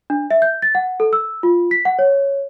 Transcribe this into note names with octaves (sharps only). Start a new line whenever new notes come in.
D4
E5
G6
A6
F#5
A4
E6
F4
B6
F#5
C#5